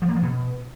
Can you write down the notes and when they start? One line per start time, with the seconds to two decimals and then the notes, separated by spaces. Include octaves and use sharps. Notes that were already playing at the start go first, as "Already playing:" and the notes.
0.02 F3
0.09 A#3
0.15 F3
0.22 B2